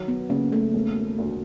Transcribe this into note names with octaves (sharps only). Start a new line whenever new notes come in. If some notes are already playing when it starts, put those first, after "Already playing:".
Already playing: D#3 F#3
B3
C#3 A#3
A3
E1
D2